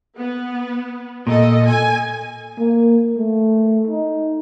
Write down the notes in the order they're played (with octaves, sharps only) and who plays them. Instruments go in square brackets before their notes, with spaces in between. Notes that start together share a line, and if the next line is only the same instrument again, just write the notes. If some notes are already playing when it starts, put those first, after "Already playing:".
[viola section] B3
[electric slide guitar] A#2 [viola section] A4 D#5
[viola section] G#5
[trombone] A#3
A3
D#4